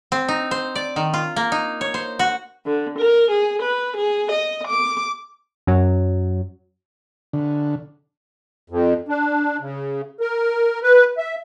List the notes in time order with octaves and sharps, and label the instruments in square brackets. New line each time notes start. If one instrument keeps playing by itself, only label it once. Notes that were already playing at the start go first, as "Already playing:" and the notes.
[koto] C4
D#4
C5
D5
D#3
F4
A#3
D#4
C#5
C5
F#4
[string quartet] D3
A#4
G#4
B4
G#4
D#5
D6
[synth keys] F#2 F#3
[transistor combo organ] D3
[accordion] F2
D4
C#3
A#4
B4
E5